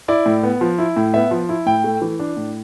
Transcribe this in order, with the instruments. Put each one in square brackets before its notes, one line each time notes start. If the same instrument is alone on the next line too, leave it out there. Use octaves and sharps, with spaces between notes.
[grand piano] E4 D5
A2
B3
F3
E4
A2
B3 E5
F3
E4
A2 G5
A3
E3
D4
A2